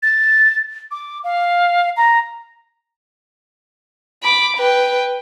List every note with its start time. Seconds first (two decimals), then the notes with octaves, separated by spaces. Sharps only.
0.03 A6
0.91 D6
1.24 F5
1.97 A#5
4.23 B5 D6
4.57 B4 G5